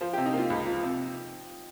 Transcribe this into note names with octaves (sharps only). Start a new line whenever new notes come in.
F3 C5
C3 G4
D#4
A#3 F4
C#2
F3
C3